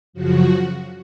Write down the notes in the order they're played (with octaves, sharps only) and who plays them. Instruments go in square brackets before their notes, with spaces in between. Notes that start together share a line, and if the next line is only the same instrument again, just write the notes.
[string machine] F#2 C#3 F3 F#4